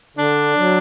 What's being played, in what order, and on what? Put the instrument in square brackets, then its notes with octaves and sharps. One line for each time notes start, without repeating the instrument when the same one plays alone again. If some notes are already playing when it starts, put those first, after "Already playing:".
[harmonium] D3 [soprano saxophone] D4
[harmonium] F#3